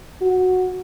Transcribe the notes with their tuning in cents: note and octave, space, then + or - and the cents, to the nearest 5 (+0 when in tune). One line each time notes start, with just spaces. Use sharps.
F#4 -5